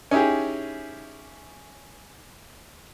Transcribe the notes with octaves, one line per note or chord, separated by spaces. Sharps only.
C#4 D#4 E4 G4 G#4